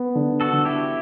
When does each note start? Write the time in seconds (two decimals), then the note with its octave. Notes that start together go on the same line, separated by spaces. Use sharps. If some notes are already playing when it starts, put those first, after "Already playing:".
Already playing: B3
0.15 D3
0.41 F#4 A4
0.53 D3
0.65 E4 G4